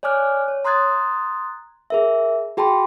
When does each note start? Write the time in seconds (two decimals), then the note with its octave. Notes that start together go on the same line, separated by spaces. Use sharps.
0.03 C#5 D5 G#5 D6 F6 F#6
0.48 C#5
0.65 A#5 C6 D#6 F#6 G#6 A6
1.90 G#4 A#4 E5
2.57 F#4 G#4 G5 A5 B5 C6